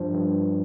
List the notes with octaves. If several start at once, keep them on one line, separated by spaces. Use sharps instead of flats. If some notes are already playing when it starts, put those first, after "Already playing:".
Already playing: G2 F3 D4
G2